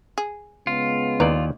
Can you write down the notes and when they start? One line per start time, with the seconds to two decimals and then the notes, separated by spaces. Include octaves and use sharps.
0.18 G#4
0.67 C#3 G#3 B3 F4
1.20 D#2 E4 B4 D5 A#5